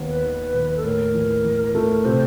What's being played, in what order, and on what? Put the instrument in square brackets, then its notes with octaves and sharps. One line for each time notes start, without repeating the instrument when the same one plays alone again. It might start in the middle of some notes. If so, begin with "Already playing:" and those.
Already playing: [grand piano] D#2 B3
[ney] B4
[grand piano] D#3
D#2
[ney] A4
[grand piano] A2 [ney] A#4
[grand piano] E3
E3
A3
[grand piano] C3 [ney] C5